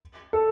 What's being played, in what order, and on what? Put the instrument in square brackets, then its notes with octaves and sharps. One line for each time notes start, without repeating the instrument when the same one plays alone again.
[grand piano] A4